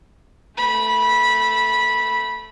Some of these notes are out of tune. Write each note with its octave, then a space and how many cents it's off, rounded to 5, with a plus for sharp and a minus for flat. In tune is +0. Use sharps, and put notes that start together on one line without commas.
A3 +0 B5 -15